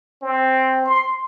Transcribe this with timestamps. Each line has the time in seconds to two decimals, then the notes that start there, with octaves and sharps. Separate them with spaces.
0.22 C4
0.86 C6